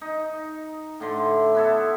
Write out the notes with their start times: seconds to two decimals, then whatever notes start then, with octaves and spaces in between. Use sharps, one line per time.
0.01 D#4
1.00 A2 D3 C6
1.55 B3 E4 A4